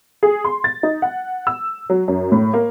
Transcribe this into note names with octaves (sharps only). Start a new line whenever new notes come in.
G#4
C6
A6
D#4
F#5
E6
F#3
F#2
A2
A#3